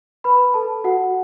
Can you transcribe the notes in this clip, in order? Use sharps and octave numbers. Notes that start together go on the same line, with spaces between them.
B4 B5
A4 A5
F#4 F#5